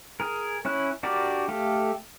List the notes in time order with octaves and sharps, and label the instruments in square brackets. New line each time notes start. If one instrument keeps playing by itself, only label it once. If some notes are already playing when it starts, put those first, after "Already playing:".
[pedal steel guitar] G#4 A#4
C#4 E4 C#5 F#6
D4 F#4 G4 A#4 D5
A3 G4 A4 F5